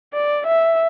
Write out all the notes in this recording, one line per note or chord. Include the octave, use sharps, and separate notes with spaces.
D5
E5